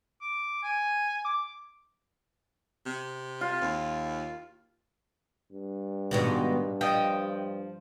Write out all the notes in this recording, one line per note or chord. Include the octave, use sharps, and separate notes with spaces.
D6
G#5
D6
C3
F4
D#2
G2
G#2 B2 D#3
F3 D#5 G5